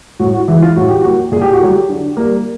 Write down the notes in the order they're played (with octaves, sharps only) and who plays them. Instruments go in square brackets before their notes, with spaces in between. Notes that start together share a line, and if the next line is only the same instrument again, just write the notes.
[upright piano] A2 F#4
F#4
E3 G#3 E4
F4
A2 F#4
G4
F#3 A#3 F#4
A#2 G#4
G4
F#4
F#3 A3 G4
D3
G3 A#3